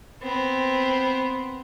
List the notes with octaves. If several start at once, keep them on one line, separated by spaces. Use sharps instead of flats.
B3 C4